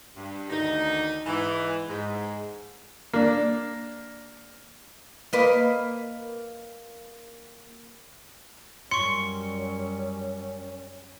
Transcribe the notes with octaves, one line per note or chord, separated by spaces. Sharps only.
G2
D2 D#3 D#4
G#2 E3
G#2
A#3 D4
A#3 B4 D#5
F#2 G3 C#4 C6 C#6 C#7